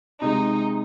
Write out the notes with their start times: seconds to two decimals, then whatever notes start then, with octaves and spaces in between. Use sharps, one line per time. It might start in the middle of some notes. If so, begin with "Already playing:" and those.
0.22 C3 G#3 D#4